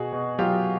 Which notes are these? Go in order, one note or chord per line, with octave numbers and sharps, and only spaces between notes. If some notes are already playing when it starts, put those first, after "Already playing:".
Already playing: B2 F#4 G#4
B2
F#3 F4 G4